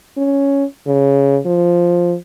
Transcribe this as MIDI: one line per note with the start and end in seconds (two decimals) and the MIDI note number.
0.17 0.65 61
0.87 1.39 49
1.46 2.16 53